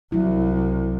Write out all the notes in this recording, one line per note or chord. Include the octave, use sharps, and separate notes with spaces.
C2 F#3 E4